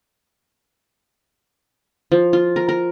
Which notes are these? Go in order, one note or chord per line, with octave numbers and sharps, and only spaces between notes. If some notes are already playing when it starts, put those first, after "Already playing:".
F3
F4
A#4
A#4